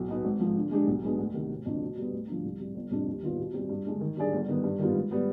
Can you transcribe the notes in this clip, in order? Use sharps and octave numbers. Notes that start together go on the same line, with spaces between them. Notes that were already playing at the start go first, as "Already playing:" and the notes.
Already playing: B1
B2 B3 D#4 B4
G#1
G#2 F3
D3
G#3 D4 G4
B1
B2 G#3 B3 D4
D2
C3 D#3
F1
F2 D3
B2
G3 B3
D2
D3 F3
C2
C3 G3
G1
F2 C3 G3 D4
D#2
D#3 G3 B3 F4
B2
G3 C4 G4
G2
D3 G#3 D4
D#3
G3 D4 G#4 D5
G1
G2 D#3 B3
G2
D#3 G3 B3 F4
G#2
G3 B3